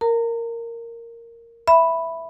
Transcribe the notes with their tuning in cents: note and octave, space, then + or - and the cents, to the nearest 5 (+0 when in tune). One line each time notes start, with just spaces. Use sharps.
A#4 -10 A#5 -35
E5 +0 B5 +0